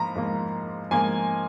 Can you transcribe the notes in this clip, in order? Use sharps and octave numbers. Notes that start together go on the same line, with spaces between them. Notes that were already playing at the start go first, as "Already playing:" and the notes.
Already playing: G#2 F3 A#3 A#5 B5
G#2 F3 A#3
G#2 F3 A#3 G#5